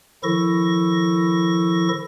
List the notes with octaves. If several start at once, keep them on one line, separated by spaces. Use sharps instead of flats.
D#3 F3 E4 A4 C#6 A#6